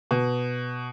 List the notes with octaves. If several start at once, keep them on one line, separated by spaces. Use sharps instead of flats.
B2